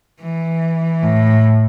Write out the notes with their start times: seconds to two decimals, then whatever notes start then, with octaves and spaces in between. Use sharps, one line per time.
0.22 E3
1.03 A2